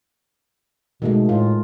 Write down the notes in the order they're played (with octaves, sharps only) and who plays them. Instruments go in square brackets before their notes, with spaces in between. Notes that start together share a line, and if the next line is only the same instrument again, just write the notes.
[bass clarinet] B2 [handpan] D#3 G#3 A3
[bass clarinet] A2 [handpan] F4